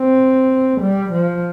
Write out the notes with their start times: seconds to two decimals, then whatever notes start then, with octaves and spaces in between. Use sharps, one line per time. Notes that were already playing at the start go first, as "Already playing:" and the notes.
Already playing: C4
0.82 G3
1.13 F3